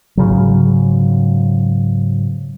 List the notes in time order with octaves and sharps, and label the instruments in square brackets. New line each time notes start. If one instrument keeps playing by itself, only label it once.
[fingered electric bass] G#2 C#3 F#3